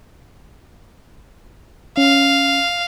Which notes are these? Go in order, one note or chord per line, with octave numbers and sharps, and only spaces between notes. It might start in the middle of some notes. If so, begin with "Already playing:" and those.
C#4 F5